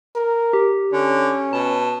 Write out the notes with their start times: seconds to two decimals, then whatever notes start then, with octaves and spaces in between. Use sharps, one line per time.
0.15 A#4
0.53 G4
0.93 D3 C#4
1.53 B2 A5